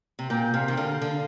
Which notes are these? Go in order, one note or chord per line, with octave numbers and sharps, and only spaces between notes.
C3
A#2 G5
C3 F5
D#3
D3 F5
D3